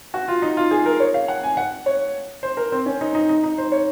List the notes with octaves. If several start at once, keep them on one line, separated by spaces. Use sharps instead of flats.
F#4
F4
D#4
F4
G#4
A#4
C#5
F5
F#5
G#5
F#5
C#5
C5
A#4
C4
C#4
D#4
D#4
D#4
D#4
C5
C#5